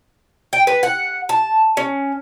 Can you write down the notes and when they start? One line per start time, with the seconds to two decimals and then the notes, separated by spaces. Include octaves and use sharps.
0.53 G5
0.67 B4
0.83 F#5
1.29 A5
1.77 C#4